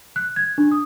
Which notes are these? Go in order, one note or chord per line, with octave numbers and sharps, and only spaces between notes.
F#6
G#6
D4
D#6